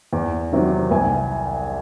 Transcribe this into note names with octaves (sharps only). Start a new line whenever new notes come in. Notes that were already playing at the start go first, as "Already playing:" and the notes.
E2
C3 D#3 F#3
C2 G#5